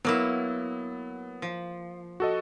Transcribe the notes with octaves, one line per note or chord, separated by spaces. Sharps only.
F#3 A#3 B3 E4
F3
F#4 A4 D#5